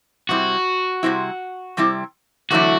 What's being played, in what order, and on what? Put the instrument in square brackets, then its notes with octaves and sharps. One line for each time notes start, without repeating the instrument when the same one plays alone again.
[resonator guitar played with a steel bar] C3 G3 C4 E4 [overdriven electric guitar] F#4
[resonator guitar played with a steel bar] C3 G3 C4 E4
C3 G3 C4 E4
[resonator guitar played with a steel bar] E2 D3 F#3 A3 E4 [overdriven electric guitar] F#4